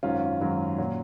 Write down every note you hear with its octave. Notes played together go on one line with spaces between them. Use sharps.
G#1 F#2 D#3 F#3 C#4 F4
G#1 F#2 D#3 F#3
A#2 F#3